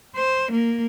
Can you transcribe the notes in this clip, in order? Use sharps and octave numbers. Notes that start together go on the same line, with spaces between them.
C5
A#3